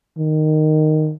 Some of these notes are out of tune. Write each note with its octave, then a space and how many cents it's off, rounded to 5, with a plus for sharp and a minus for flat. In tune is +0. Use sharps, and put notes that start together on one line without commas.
D#3 -10